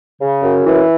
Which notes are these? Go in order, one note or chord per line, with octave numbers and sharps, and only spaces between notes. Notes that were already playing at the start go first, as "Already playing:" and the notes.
C#3
F#2
E3